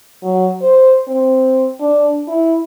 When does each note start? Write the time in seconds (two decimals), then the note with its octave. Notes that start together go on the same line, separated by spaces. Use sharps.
0.23 F#3
0.62 C5
1.08 C4
1.80 D4
2.27 E4